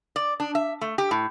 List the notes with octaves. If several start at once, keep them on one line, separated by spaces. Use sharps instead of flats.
D5
D4
E5
A3
G4
A2